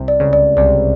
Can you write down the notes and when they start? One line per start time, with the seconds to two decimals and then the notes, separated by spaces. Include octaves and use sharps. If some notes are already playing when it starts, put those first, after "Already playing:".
Already playing: C2 C3
0.08 D5
0.20 C#2 C#3
0.33 D5
0.57 C2 C3 D5